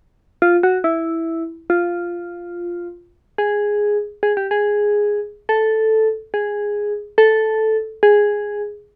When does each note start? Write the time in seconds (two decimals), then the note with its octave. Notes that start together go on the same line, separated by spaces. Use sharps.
0.42 F4
0.63 F#4
0.84 E4
1.70 F4
3.38 G#4
4.23 G#4
4.37 G4
4.51 G#4
5.49 A4
6.34 G#4
7.18 A4
8.03 G#4